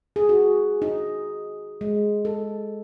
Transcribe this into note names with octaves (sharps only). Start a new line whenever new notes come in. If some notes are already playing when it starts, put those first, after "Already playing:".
G#4
F#4
D#4
G#3
A4